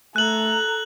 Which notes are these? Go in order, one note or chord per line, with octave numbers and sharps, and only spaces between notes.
A3 A4 A#5 F#6 F#7